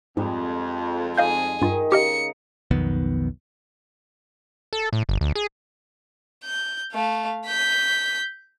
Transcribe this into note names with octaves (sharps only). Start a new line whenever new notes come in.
F2 G#2 G3 G#3
D#4 G#4 D#5 F5 G6
G2 D#3 D#4 F4
C#3 G4 A#4 D#5 A#5 C#7
B1 F2 D#3 B3
A4
A2
G1
D2
G#4
G6
A3 F5
G6 B6